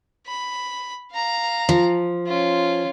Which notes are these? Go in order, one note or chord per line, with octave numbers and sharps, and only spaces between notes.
B5
F5 A#5
F3
C#4 F4